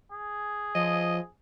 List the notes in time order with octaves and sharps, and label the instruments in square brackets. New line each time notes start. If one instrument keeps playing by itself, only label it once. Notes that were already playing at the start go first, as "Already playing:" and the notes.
[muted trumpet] G#4
[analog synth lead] F3 [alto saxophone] D#5